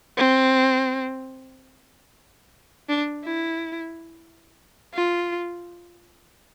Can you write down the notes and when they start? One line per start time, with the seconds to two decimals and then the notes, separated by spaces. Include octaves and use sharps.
0.17 C4
2.89 D4
3.24 E4
4.94 F4